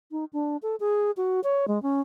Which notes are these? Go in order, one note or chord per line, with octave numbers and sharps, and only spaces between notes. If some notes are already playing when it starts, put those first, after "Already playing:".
D#4
D4
A4
G#4
F#4
C#5
G#3
C#4